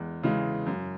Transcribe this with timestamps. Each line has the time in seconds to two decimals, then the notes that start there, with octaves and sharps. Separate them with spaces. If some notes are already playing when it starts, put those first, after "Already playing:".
Already playing: E2 G#3
0.23 C#3 E3 G#3
0.66 F#2